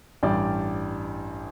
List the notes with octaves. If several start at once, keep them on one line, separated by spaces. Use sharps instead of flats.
A1 G2 G3 D5 G5